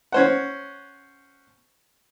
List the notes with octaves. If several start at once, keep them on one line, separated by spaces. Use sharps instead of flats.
C#4 C5 F#5